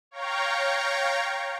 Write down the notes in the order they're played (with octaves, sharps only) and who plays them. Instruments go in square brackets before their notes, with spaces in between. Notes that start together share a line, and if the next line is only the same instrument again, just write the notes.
[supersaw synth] C#5 F5 G5 A#5 C#6